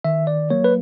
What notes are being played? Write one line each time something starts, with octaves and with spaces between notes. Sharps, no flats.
D#3 E5
D5
F#3 A#3 C#5
B4